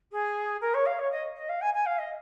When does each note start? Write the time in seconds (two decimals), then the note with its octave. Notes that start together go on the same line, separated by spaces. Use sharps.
0.12 G#4
0.61 A#4
0.74 C#5
0.86 F5
0.99 C#5
1.11 D#5
1.36 D#5
1.49 F5
1.61 G#5
1.73 G#5
1.85 F5
1.98 D#5